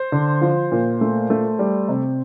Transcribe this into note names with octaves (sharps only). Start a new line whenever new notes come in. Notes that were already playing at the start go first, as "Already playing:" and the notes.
Already playing: C5
D3
F3
A#2
A3
A3
G3
C3